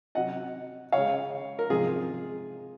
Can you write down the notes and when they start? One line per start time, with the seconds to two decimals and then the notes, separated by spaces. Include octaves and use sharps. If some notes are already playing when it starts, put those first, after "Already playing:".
0.15 C3 F#3 D#5 F#5
0.92 C#3 G#3 C#5 F5
1.59 A#4
1.70 C3 F3 G#3 F4 G#4